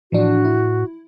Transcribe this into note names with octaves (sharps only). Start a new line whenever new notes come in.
A2 E3 F3 D4 F#4
E4